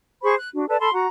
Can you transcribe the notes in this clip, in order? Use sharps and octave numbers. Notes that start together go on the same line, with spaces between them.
G#4 C5 B5 C#6
F#6
D4 F#4
A4 B4 D5 A5
A4 A5 B5 C6
F#4 F#5 A#5